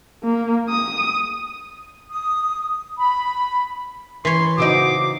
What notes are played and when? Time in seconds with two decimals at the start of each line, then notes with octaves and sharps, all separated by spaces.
0.24 A#3
0.70 D#6
2.11 D#6
2.98 B5
4.25 E3 B4 C#5 C6
4.58 C#3 C4 D#4 F#4 D6